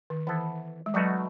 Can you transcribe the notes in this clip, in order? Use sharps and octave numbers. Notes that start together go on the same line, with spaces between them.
D#3
E3 B3 E4 A4
G#3
B2 F#3 A3 D#4 F#4